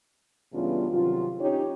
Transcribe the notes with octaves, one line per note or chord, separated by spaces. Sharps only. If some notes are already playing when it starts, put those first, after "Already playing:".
G2 C#3 E3 B3 D4 F4
C3 D#3 F#3 F4
C#4 D#4 G4 C#5